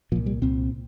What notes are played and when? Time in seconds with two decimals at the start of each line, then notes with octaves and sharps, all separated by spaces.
0.12 A#2 F3
0.16 C2
0.26 G3
0.42 C2 A#2 C4